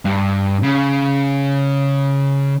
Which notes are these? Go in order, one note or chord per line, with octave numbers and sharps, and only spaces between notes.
G2
C#3